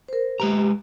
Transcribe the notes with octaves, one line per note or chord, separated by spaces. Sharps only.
A#4 C5
G#3 G4 B4 A#5